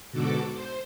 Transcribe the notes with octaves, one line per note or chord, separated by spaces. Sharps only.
G#2 B2 D3 F#4 A4 D6
C5